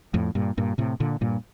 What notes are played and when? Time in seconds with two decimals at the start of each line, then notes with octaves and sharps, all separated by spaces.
0.14 F2 A2
0.35 G2 A#2
0.58 G2 A#2
0.78 A2 C3
1.00 A#2 D3
1.21 G2 A#2